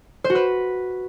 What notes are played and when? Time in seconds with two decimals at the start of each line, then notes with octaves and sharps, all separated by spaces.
0.24 C5
0.30 F#4
0.35 B4